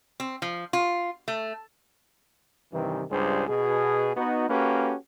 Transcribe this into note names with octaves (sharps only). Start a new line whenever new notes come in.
C4
F3
F4
A3
G2 C3 D#3 E3
C#2 G2 G3 D4 G#4 C5
B2 G#4
B3 D#4 F#4
A#3 C#4 F#4 G4 A4 B4